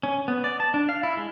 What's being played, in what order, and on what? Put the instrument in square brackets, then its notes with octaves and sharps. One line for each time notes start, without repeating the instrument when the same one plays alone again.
[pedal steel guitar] C#4
B3
D5
A5
D4
F5
E4
G#3